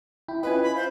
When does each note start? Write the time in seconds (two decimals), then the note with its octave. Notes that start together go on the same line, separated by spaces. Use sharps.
0.28 E4 G5 B5
0.43 C#4 E4 F4 B4 D#5 G#5
0.63 B5
0.76 C5 F5